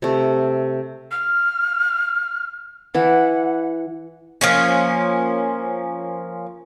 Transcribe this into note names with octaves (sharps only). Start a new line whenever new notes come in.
C3 A3
F6
E3 E4 F#5
F3 A#3 C#4